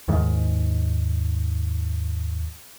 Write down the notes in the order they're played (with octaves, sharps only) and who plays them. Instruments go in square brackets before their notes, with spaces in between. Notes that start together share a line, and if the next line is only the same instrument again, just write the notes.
[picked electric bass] D#2 G#2 D#3 G#3